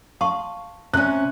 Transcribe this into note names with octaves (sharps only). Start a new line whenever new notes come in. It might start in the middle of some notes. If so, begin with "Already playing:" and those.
F5 A5 C6 C#6
C3 C#4 C5 F#6